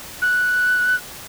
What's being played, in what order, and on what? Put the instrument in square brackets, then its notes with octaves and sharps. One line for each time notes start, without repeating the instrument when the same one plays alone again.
[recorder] F#6